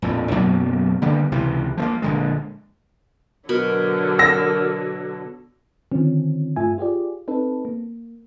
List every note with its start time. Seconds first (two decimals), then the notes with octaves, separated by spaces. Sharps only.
0.02 A#1 F2 A2
0.31 F#2 B2 F#3 A#3
1.02 D3 G3 A#3 B3
1.32 C#2 C3 E3
1.77 F3 A3 A#3
2.02 A#1 D3 G#3
3.49 B2 D3 F#3 A#4 B5
4.19 E6 A#6
5.91 D3 D#3 F3 C4 C#4
6.56 G2 A3 F4 E5 G#5
6.78 F4 G4 G#4 D5
7.28 C4 D#4 A4 B4
7.65 A#3